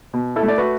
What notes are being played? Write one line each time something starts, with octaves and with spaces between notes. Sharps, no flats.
B2
E4 A4
A3
D5
F#4 B4